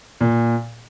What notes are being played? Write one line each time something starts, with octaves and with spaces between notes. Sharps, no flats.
A#2